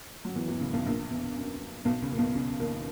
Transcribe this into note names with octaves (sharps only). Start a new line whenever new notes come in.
F#3
E2 E3
E2 E3
C#2 C#3
B1 B2
A#1 A#2
E2
F#2
B1 B2
C#2 C#3
A#2
B1 B2
C#2 C#3
D#2 D#3